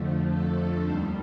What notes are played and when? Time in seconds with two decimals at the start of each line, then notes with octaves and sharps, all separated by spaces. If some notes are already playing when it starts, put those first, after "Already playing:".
Already playing: F2 D3 F3 A3
0.26 A4
0.53 A4
0.81 D#2 D#3 G3 C5